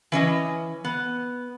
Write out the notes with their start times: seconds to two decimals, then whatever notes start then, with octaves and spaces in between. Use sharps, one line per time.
0.12 E3 C#4 D#5
0.85 B3